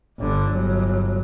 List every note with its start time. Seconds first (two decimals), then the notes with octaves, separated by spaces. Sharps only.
0.19 G1 D3
0.52 G1 F#3